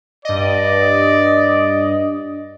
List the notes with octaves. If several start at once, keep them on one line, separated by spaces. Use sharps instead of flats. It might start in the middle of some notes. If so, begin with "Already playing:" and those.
G2 D5 D#5